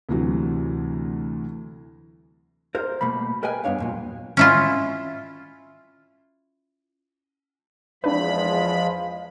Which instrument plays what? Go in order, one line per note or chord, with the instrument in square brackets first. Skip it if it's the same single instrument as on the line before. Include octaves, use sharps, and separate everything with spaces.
[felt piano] D2 C3 E3 F#3
[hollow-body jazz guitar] A#4 C5
B2 A3 A#3 B5
A#4 B4 D#5 G5 G#5
G2 B3 D4 C#5 F5
E2 A#2 F#3
[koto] C#4 E4 F4
[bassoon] E2 [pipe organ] F3 G#3 B5 [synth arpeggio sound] C4 D4 B4 [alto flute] F5